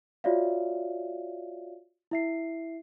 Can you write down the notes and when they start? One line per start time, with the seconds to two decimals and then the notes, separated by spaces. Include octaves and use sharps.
0.24 F4 F#4 C#5 D5 E5 F5
2.11 E4 E5 C7